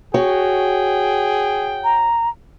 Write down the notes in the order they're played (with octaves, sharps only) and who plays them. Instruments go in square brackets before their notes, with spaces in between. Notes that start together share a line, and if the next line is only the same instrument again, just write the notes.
[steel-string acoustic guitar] F#4 C#5 [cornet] G#4 [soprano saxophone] G5
[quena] A#5